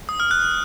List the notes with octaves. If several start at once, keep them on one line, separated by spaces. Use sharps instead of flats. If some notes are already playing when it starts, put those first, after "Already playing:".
D#6
F6
F#6